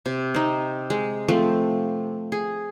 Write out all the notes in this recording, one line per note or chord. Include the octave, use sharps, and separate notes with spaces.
C3
C4 D#4
G#3
F3 A3 C4
G#4